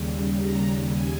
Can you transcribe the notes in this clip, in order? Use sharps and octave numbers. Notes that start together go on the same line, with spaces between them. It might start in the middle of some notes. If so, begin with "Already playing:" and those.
Already playing: D#2 C#3 G3
A#5
G#5